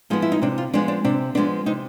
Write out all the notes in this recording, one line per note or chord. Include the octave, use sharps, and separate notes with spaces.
F3 G#3 B3 D#4
E4
D#4
C3 D4
F4
F3 G#3 B3 D4
D4
C3 D4
F3 G#3 B3 D4
C3 D#4